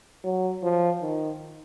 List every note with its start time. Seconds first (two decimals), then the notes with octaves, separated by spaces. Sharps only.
0.24 F#3
0.63 F3
1.02 D#3